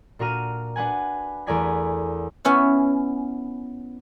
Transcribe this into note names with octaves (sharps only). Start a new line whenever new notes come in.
A#2 D4 F#4 A#4 F6 D#7
D4 B4 F#5 G#5
E2 A3 A#4 D5 G#5 B6
B3 C#4 E4 F#5